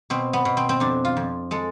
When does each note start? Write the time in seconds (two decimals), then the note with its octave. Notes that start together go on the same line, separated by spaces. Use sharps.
0.10 B2 C4
0.33 B3
0.45 B2
0.57 C4
0.69 C4
0.80 F2 D4
1.05 F4
1.17 F2
1.51 G#3 A4